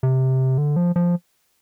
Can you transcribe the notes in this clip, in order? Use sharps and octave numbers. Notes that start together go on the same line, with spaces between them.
C3
D3
F3
F3